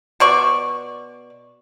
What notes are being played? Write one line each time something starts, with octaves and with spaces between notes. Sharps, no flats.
B2 D5 C#6